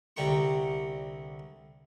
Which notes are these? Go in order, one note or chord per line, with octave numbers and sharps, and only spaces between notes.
C2 D3 G4 A#5 C#6